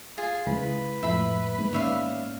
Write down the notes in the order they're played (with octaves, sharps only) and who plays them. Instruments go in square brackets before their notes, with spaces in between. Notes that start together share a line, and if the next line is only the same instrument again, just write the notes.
[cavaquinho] F4 [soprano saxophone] G#4
[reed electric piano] C#2 [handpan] G#3 E4 G#4 [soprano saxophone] B4
[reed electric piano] F2 A2 [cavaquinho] E5 B5
[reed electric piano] G#2 [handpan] A#3 B3
[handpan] D#3 C#4 D5 [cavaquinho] C#5 E5 F5